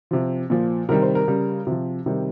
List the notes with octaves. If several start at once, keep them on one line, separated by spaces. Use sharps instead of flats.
C3 F3
A#2 F3
C3 D#3 G3 A#4
C5
A#4
C#3 G3
C3 F3
C3 D#3 G3